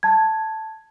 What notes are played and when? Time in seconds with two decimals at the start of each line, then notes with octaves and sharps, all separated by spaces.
0.03 A5 G#6